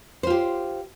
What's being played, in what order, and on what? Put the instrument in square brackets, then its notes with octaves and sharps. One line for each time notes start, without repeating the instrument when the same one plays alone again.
[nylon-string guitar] C5
F4
G4